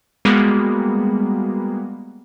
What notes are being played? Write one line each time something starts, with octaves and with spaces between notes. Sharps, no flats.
G3 G#3 A#3 B3 F#4 G#4